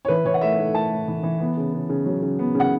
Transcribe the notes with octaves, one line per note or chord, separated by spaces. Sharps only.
C#5
E3 B4
E3 C#5
F#5
A3 E5
A3
A3 A5
A2
E3
E3
B3
C#3
C#3
C#3
F#3
C#3
B3
C#3
F#5